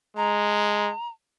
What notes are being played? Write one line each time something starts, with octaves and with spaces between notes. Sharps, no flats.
G#3 A#5